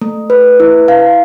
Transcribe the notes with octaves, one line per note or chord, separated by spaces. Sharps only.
A3
B4
E4
F5